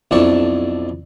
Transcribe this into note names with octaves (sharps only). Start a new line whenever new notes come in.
B1 F2 D4 E4 A5 C#6